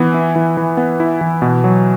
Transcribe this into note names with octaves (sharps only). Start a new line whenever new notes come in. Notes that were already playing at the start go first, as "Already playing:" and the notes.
Already playing: E3 B3
E4
E3
E3
B3
E4
E3
B2
F#3